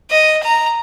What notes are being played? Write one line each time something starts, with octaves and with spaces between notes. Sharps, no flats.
D#5
A#5